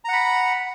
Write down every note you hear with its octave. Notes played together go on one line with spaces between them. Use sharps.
F#5 A#5 B5